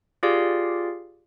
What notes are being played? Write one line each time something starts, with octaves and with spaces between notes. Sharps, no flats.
F4 G4 G#4 D5 F5